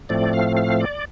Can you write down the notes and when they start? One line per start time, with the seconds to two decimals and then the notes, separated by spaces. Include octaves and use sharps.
0.09 A2 F3 A3 C4 D5
0.33 F5
0.57 F5
0.80 D5